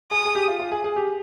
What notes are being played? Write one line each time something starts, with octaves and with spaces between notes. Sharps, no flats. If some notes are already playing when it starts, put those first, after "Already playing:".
G#4 D#6
G#4
G4
F4
F4
G#4
G#4
G4